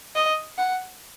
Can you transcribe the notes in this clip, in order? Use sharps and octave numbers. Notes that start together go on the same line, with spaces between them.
D#5
F#5